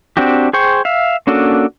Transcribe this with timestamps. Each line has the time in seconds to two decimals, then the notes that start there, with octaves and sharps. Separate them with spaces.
0.17 C4 D4 F#4 G4
0.53 G#4 C5 G5 C#6
0.85 E5 F5
1.27 A#3 C#4 D4 F#4 A4